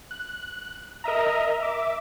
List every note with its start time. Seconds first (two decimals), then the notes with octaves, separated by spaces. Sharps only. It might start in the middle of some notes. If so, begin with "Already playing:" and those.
0.11 F#6
1.04 A#4 D#5 E5 A#5
1.60 E5 D6